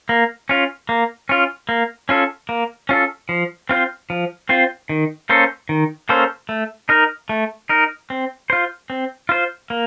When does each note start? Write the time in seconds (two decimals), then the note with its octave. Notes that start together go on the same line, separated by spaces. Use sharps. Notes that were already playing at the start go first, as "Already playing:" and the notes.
0.09 A#3
0.49 C#4 F4
0.89 A#3
1.29 C#4 F4
1.69 A#3
2.09 C#4 F4 A4
2.49 A#3
2.89 C#4 F4 A4
3.29 F3
3.69 C4 F4 C5
4.10 F3
4.49 C4 F4 C5
4.89 D#3
5.30 A#3 C#4 A4 C5
5.69 D#3
6.09 A#3 C#4 A4 C5
6.49 A3
6.89 D#4 A#4
7.29 A3
7.69 D#4 A#4
8.10 C4
8.50 F4 C5
8.90 C4
9.29 F4 C5
9.70 A#3